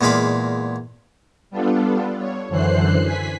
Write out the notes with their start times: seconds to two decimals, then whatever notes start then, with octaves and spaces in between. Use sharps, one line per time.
0.01 E2 A#2 G#3 F5 B5 D6
1.50 G3 B3 D4 F4 A4
2.18 C#5
2.49 F#2 D3 E3 C5 F#6 C7
3.05 G#5 B6